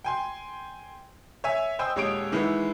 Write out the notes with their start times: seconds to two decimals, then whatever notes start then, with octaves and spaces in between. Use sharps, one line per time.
0.04 G5 G#5 C6
1.44 C#5 E5 G#5
1.79 C5 D#5 G5 G#5 D#6 E6
1.96 D#1 G#3 C#5 D#6 D7
2.32 D#3 E3 G#3 B3 E4